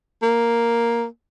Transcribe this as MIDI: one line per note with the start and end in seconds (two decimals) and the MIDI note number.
0.22 1.04 58